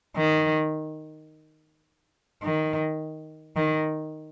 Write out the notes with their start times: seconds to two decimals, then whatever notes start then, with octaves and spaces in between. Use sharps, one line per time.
0.17 D#3
2.43 D#3
3.56 D#3